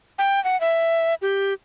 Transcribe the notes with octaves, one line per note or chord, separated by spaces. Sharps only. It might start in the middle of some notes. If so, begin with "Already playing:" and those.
G5
F#5
E5
G4